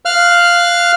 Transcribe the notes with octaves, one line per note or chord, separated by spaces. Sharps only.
F5 F6 F#6